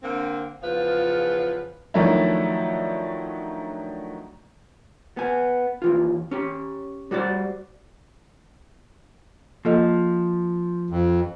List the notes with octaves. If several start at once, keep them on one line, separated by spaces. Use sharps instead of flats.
D3 A#3 C4
E2 C#3 F3 F4 B4
D#3 F3 F#3 A3 D4 E4
B3 G#5
D#2 E3 F4
C#4 G4
G3 F#4 C5 D5
F3 A#3 A4 D#5
F2